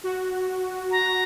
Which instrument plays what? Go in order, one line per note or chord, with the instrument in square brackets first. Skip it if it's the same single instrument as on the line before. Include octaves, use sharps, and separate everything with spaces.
[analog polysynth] F#4
[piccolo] A#5